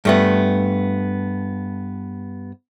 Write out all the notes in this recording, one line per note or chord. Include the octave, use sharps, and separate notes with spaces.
G2 A3 B3